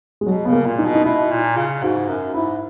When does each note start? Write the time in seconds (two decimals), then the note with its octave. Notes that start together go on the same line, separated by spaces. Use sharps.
0.21 G#3
0.26 B2 F#3
0.45 C#3 B3
0.53 A#3
0.66 A#2
0.79 D#4
0.85 B2
0.95 D#4
1.04 B2 E4
1.31 A#2
1.57 C#3
1.83 G#2 F#4
2.08 F#2
2.34 G#2 E4